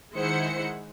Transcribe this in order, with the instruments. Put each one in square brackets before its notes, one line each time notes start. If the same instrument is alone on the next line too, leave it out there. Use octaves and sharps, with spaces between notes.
[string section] D#3 G#3 E4 C5 F#5 C#7